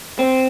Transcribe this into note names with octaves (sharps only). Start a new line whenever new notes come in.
C4